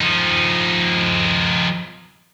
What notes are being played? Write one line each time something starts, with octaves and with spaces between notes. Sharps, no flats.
F3 D#4